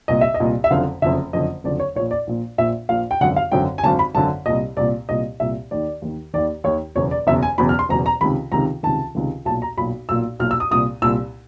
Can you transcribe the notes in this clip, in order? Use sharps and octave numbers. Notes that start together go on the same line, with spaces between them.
C2 A#2 D#5
E5
D#5
C2 A#2
E5
F#1 F2 D3 F5
F#1 F2 D3 E5
F#1 F2 D3 D#5
F#1 F2 D3 D5
C#5
A#1 A#2 C#5
D5
A#1 A#2
A#1 A#2 E5
A#1 A#2 F5
G5
G#1 F#2 D3 F#5
F5
G#1 F#2 D3 G5
G#5
G#1 F#2 D3 A5
B5
G#1 F#2 D3 A5
C2 A#2 D#5
C2 A#2 D5
C2 A#2 D#5
C2 A#2 E5
D#2 D#3 D5
D#2 D#3
D#2 D#3 D5
D#2 D#3 C#5
F#1 E2 B2 C#5
D5
F#1 E2 B2 E5
G#5
F#1 E2 B2 B5
F6
C6
F#1 E2 B2 A#5
A#5
C#2 C3 D#3 B5
C#2 C3 D#3 A#5
C#2 C3 D#3 A5
C#2 C3 D#3
B1 A#2 A5
A#5
B1 A#2 B5
B1 A#2 E6
B1 A#2 F6
E6
D#6
C2 A#2 D#6
C2 A#2 E6